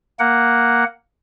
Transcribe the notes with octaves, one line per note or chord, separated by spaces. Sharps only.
A#3 F#5